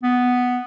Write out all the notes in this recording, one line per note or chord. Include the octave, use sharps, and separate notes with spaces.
B3